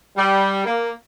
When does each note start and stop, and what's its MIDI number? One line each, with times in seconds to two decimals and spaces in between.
0.18 0.64 55
0.66 0.90 58